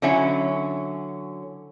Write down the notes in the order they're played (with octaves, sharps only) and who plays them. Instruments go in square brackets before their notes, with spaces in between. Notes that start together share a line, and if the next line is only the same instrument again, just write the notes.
[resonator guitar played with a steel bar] D3 F#3 C#4 E4 C#5